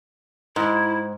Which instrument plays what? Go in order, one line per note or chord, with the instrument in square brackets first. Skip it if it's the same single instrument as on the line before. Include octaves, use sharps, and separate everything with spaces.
[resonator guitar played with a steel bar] G#2 [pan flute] E4